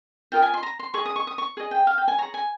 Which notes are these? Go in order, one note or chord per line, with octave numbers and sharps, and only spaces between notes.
F4 A#4 D#5 G5
G#5
C6
A#5
C6
G#4 D#5 C#6
D#6
C#6
D#6
C#6
G#4 D#5
G5
F5
G5
G#5
G#4 C#5 A#5
G#5